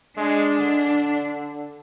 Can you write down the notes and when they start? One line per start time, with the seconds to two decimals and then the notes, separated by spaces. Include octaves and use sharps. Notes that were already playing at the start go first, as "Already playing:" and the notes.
0.17 G#3 D4
0.59 D3